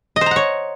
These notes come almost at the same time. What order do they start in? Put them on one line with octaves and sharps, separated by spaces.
D#5 C5 A#5 F#5 C#5